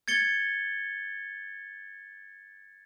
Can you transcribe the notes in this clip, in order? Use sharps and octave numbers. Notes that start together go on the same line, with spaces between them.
G#6 A6 C#7 G7